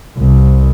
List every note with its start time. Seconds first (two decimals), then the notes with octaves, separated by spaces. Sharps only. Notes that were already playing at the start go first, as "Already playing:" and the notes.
0.18 C2